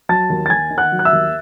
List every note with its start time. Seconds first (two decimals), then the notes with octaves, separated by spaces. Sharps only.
0.09 F#3 A5 A6
0.30 D#2
0.46 A6
0.50 D#2 G#5 G#6
0.70 D#3
0.78 F#5 F#6
0.92 F#3
0.99 F#6
1.05 E5 E6
1.13 D#2